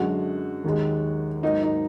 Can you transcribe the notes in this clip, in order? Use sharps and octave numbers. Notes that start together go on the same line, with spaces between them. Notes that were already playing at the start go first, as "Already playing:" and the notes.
Already playing: F#2 D3 G#3 F#4
D#2 D#3 G#3
G#2 F#3 A#3 D#4
D#4